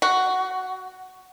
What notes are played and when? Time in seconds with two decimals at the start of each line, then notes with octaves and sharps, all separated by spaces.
0.02 F#4